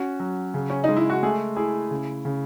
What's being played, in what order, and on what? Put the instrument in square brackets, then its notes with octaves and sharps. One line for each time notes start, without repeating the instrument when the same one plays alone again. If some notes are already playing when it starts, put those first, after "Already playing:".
Already playing: [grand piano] C#4 [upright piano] F#4
[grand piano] F#3
C#3
[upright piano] C#4
[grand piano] G#3 [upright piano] D#4
[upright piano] E4
F#4
[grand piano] A3 [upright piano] G#4
[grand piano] E4 [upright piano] G#4
[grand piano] C#3
C#3